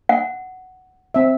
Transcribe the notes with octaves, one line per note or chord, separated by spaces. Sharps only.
F#5
C4 E5